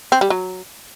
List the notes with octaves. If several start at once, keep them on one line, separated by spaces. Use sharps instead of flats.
C4
G3
F#3